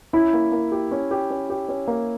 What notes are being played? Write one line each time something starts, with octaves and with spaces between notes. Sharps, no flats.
C#4 E4
A#3
A#3
G4
C#4
G4
C#4
G4
C#4
A#3